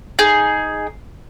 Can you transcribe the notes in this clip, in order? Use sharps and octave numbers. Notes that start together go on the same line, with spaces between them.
D#4 G#4